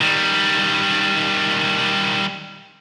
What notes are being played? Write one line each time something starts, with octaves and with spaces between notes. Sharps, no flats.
D#3 G3